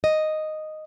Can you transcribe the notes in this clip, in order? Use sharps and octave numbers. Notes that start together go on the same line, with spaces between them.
D#5